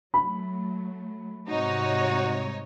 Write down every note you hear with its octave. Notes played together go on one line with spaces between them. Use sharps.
F#3 A3 B5
G#2 C3 G3 D#4 F#4 C#5